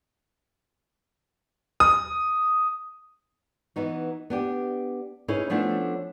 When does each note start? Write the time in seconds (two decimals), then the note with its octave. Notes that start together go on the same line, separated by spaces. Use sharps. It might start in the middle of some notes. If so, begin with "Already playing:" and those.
1.80 D#6
3.76 E3 B3 D#4 F#4
4.30 B3 D4 G4
5.28 C#4 D#4 E4 G#4 B4
5.50 F3 A3 B3 C#4 D4 E4